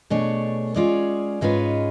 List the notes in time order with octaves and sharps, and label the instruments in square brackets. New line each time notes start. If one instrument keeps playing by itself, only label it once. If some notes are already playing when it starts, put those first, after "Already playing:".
[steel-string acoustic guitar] B2 A3 D4 G#4 C#5
G#3 C#4 F4 G#4 D5
G#2 G#3 C#4 F4 B4